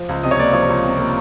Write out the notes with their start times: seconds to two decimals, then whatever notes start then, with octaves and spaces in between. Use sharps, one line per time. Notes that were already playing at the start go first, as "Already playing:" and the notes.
Already playing: F3
0.09 C#2
0.23 C3 D#5
0.31 C#5
0.39 A#3 D5
0.53 F3 C#5
0.69 C#2
0.84 C3
0.98 A#3